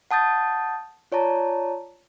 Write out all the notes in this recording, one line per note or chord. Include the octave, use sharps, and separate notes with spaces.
F#5 A5 D#6 G6 A6
F4 C#5 D5 A5 A#5